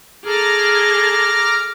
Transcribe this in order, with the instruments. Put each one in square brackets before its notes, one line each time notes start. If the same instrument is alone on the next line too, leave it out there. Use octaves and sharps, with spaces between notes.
[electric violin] G#4 A4 [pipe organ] A#5 D6 F6